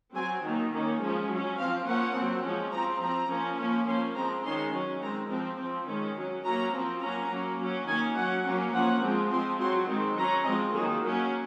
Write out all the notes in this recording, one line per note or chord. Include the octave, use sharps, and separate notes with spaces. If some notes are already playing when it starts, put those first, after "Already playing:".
F#3 C4 G#5
D#3 F#3 A#3
D#3 A#3 C#4
F3 G#3 C#4
F#3 C#4
F3 C4 F5
F3 A#3 C#4 F#5
F#3 C4
F3 G#3 C#4
F3 C4 A#5
F3 C4 A#5
F3 A#3 C#4
F3 A#3 C#4
F3 A#3 C#4 C6
F3 G#3 C4 A#5
D#3 G#3 C#4 C6
F#3 C#4
D#3 G#3 C4 A#5
F3 C4
F3 C4
D#3 G#3 C#4
F#3 C#4
F#3 A#3 C#4 A#5
F3 C4
F#3 A#3 C#4 A#5
F#3 A#3 C#4
F#3 C#4
D#3 A#3 C#4 G#5
F#3 C#4 F#5
F#3 A#3 C#4
F3 A#3 C#4 F#5
F3 G#3 C4
F3 G#3 C4 C6
F#3 C4 C6
D#3 G#3 C4
F#3 C#4 A#5
F3 G#3 C4 D#5
D#3 F#3 A#3 G#4
F#3 A#3 C#4 F#4